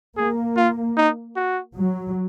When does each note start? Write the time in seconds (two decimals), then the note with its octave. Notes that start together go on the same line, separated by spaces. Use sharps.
0.16 A#3 G#4
0.56 F4
0.97 D#4
1.36 F#4
1.76 F#3